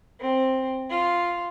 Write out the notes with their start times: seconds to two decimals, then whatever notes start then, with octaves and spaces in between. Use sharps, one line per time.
0.20 C4
0.90 F4